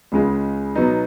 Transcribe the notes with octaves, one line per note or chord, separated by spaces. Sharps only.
C#2 C#3 G#3
B2 F#3 B3 D#4